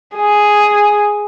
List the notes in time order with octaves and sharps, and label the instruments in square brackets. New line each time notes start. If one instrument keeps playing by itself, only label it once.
[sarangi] G#4